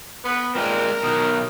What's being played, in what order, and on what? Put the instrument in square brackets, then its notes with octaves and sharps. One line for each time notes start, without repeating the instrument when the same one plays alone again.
[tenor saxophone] B3 [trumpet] B4
[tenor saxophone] A#2 [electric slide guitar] G#3 C4 [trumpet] A#4
[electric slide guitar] B2 F#3 [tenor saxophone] D#3